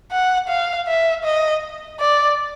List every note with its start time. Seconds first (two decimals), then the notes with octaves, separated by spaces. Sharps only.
0.11 F#5
0.48 F5
0.87 E5
1.24 D#5
1.99 D5